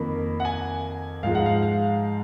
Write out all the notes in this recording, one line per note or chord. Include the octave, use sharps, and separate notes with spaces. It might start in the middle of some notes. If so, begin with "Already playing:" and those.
Already playing: F2 D#3 A#3 B5
F#5
G#5
G#2 F3 G#3 F5
F#5
F5
F5